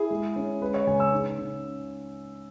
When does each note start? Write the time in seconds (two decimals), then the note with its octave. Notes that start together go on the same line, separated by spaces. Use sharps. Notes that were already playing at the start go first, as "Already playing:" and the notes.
Already playing: E4 G#4
0.10 G#3
0.36 C#4
0.62 G#3 B4
0.74 C#5
0.87 C#2 G#5
1.00 E6
1.12 D#4
1.38 C#3